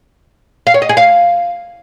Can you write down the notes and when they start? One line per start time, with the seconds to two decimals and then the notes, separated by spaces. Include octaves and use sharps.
0.67 F5
0.74 C#5
0.82 D#5
0.89 G#4
0.97 F5